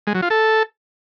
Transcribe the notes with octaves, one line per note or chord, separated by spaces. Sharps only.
G#3
F#3
F4
A4